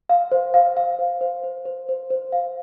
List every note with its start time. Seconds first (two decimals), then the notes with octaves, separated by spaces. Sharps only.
0.09 F5
0.32 C5
0.54 F5
0.77 F5
0.99 C5
1.21 C5
1.44 C5
1.65 C5
1.89 C5
2.10 C5
2.32 F5